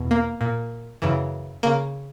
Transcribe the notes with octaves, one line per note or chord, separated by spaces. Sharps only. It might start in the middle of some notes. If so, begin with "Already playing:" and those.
Already playing: E2 B2
A#3
A#2
F#2 C#3 E3
C#3 A#3